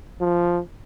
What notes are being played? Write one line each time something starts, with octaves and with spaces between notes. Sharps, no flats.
F3